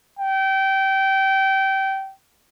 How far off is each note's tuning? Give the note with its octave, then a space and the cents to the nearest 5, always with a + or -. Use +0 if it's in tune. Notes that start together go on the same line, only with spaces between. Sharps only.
G5 -20